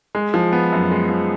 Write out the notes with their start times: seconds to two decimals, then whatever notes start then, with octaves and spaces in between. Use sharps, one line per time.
0.15 G#3
0.34 F3
0.52 B3
0.72 F#2
0.91 G#3
1.09 F3